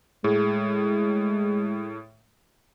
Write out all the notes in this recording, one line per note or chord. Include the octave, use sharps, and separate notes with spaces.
A2 G#3 G#4